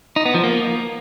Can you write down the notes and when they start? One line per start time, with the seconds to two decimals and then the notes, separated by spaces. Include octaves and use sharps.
0.16 D#4
0.25 B3
0.35 F3
0.44 A#3